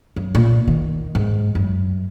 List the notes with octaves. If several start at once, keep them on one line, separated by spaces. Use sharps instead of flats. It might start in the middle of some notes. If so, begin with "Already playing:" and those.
F#2
A#2
D#3
G#2
F#2